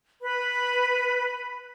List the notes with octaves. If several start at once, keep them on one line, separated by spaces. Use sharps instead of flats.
B4 B5